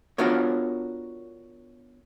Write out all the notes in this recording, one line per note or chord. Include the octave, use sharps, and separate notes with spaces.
B3 D4 F4 F#4 A#4 C#5